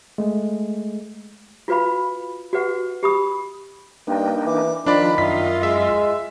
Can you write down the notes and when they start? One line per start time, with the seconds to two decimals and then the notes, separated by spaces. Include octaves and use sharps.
0.18 G#3 A3
1.68 F4 F#4 B4 F5 B5
2.53 F#4 G4 B4 F#5
3.03 G4 B5 D#6
4.07 G2 A#3 D4 D#4 G5
4.45 E3 D6
4.86 D#3 F3 D4 F4 D5 B5
5.18 F#2 E4 F4 D#5 F5 B6
5.63 G#3 E5